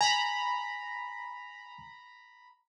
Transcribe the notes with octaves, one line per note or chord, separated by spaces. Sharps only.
G#5 A#5 B5